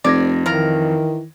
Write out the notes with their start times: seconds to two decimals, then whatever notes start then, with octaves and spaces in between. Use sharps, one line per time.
0.04 F1 F2 D5 G#6 A#6
0.46 D#3 E3 F4 A#4